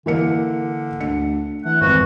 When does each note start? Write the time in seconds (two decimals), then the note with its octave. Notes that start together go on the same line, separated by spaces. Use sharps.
0.06 D3 E3 A#3 C#7
1.00 D2 C#7
1.65 E3 A3 F#5
1.81 G#1 F2 E3 F#4